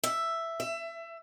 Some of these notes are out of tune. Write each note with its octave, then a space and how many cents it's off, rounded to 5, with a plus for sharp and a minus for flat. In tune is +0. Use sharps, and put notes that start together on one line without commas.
E5 +5
E5 +25